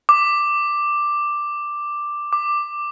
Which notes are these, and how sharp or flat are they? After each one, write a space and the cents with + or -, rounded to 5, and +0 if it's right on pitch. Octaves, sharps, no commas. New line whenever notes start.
D6 +5
D6 +10